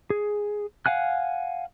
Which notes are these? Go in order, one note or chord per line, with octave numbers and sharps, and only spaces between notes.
G#4
F5 F#5 G#5 F#6